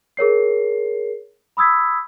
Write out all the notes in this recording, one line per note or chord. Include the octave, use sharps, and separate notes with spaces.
G#4 A#4 C#5 C7
B5 D#6 E6 G#6 B6